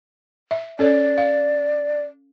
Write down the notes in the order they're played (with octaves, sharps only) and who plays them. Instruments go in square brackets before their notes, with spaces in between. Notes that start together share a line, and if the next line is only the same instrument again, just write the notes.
[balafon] E5
[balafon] C#4 A4 C#5 [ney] D5
[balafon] F5